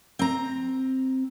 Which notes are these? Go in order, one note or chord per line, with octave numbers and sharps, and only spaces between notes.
C4 A#5